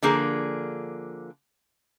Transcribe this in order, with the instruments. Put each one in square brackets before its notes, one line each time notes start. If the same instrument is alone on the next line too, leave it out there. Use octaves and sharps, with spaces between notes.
[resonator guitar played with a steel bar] D3 F3 A#3 G#4